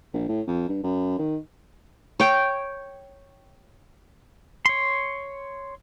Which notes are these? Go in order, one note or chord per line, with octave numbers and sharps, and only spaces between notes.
A#1
A2
F2
G2
F#2
D#3
C#5 G5
C#5 C6